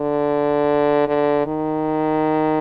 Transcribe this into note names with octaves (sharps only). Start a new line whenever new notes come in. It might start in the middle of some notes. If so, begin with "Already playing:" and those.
Already playing: D3
D3
D#3